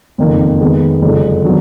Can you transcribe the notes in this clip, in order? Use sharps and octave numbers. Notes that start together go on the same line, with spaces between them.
F#1 F2 D#3 A#3 D#4
F2 D#3 G#3 B3
F#1 F2 D3 F3 G#3
D#3 F#3 B3 D4